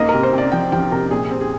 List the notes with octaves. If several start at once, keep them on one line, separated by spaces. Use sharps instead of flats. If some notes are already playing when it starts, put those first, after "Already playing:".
Already playing: G#2 A#3 D#5
C3 A#4
C5
C3
D5
F3 G5
F3 G5
C3 A#4
A#2 G#4
C4
G#4